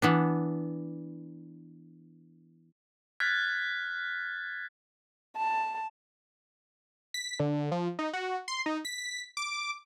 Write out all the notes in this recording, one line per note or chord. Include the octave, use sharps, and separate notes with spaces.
E3 B3 D4
F6 F#6 G#6 A6 B6
A5
B6
D3
F3
D#4
F#4
C6
D#4
B6
D6